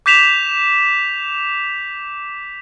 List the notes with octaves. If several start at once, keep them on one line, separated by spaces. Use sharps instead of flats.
D6 G6 B6 E7 F7